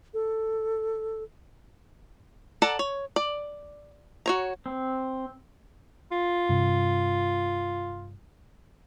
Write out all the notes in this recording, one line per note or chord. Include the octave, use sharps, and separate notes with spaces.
A4
A4 D5 F#5 A5 A#5
C#5
D5
F#4 C#5 A#5
C4
F4
G2 C3